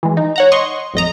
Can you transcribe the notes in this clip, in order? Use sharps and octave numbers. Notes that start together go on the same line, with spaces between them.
E3 G#3
D#4
C#5 F#5 A#5
D#5 C6 C#6
A1 F2 D#5 A#5